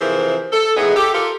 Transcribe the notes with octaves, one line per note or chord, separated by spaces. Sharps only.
C3 E3 F3 G#4 A#4 C5
A4
A2 G#3 B3 D#4 G#4
G4 A4
F4 G4 A4 A#4